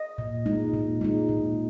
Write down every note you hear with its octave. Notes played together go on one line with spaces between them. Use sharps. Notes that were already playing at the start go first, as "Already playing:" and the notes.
Already playing: D#5
A#2
G#3 D#4
A#2
G#3 D#4
A#2